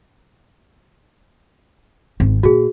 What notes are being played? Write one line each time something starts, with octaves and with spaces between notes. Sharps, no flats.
G#1 C4
A#2 F#4 G#4